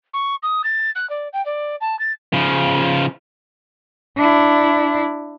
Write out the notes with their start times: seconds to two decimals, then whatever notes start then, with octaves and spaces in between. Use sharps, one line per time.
0.13 C#6
0.43 D#6
0.64 A6
0.95 F#6
1.10 D5
1.33 G5
1.46 D5
1.81 A5
1.99 A6
2.33 C#3 F3
4.17 D4 E4